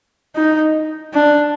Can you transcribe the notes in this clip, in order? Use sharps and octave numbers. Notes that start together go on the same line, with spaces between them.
D#4
D4